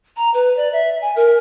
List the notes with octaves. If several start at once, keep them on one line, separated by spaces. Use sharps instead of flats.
A#5
B4
D5
E5
G#5
A#4